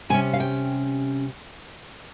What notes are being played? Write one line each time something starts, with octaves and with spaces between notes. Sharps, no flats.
C3 G3 C#4 G#5
F5
G5